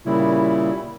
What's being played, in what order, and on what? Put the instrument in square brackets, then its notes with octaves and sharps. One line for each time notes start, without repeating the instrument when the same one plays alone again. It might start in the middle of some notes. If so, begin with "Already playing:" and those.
[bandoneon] A#2 C#3 G3 E4